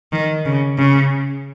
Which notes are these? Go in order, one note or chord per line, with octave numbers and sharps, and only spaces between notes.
D#3
C#3
C#3